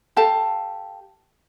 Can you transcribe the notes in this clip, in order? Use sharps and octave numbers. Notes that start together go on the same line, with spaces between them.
G4 A4 F5 A5